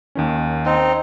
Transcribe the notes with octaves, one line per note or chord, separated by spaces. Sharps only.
D#2 D#3 C#4
C4 D#4